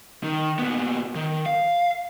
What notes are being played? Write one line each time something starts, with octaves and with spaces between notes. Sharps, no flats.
D#3
A#2 B3
D#3
F5